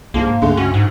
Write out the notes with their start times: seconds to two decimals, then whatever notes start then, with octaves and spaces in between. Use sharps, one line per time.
0.14 C2 G2 F3 G#3 A#3
0.27 G#2
0.42 C#2 G2 D3 G#3 A3 D4
0.57 D2 C#4 F#4
0.74 G#2